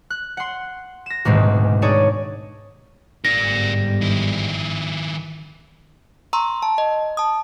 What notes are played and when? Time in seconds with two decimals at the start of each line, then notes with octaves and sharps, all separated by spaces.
0.10 F#6
0.37 F#5 C6
1.06 A#6 E7
1.25 D#1 D2 G#2 B2 G#3 C4
1.82 D4 D#4 G#4 C#5 D5
3.25 G1 G#2 G3 A#4 D5 A#6
4.01 D#3 E4
6.33 A#5 C6 C#6 E6
6.63 A5
6.78 D#5
7.17 A5 D#6